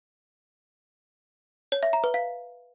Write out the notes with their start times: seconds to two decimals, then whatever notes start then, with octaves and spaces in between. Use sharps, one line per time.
1.72 C#5
1.83 E5
1.93 A#5
2.04 B4
2.14 F5